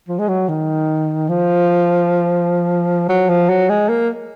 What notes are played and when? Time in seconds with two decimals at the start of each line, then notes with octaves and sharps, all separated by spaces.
0.08 F3
0.19 G#3
0.28 F#3
0.49 D#3
1.29 F3
3.09 F#3
3.29 F3
3.49 F#3
3.69 G#3
3.89 A#3